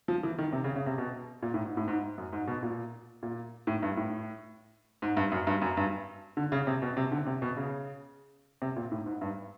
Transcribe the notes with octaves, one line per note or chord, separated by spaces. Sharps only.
F3
E3
D#3
C3
C#3
C#3
C3
B2
A#2
A2
G#2
A2
G#2
F#2
G#2
B2
A#2
A#2
A2
G2
A2
G#2
G2
F#2
G2
F#2
G2
D3
C#3
C3
B2
C3
D3
C3
B2
C#3
C3
A#2
A2
G#2
G2